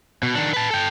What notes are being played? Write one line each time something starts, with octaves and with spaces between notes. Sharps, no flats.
B2
D#3 D4
B4 A5
A4 G5